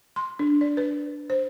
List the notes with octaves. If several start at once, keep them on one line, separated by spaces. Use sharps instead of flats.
C6
D4
D5
B4
C5